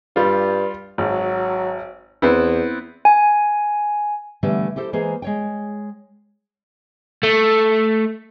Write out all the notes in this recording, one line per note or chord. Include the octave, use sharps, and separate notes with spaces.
G2 G3 F4
G#1 F#3
E2 B3 C4 E4
G#5
D3 E3 G3 A3 B3
E4 G4 A4 C5
E3 G#3 A#3 G#4 C5
G#3 C#5 G5
A3